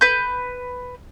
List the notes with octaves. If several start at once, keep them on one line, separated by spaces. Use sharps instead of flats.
B4 G6